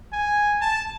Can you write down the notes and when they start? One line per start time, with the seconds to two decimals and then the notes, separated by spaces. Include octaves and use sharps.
0.13 G#5
0.61 A5